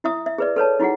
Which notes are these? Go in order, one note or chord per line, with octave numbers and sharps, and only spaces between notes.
E4 E5 D#6
E5
G#4 B4 D5
A4 B4 C#5 A5
D#4 E4 F#4 G#4 F#5